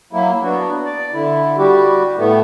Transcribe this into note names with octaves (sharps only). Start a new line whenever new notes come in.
F#3 A#3 E4
B3 D4 F#4
D5
D3 E4
G3 F#4 G4
A2 A3 B3